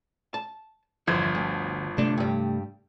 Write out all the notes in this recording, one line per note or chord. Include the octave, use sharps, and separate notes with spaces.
A5
G1 E2 F3 E4 C5 G#6
D2
C3 A3 D4
G2 G3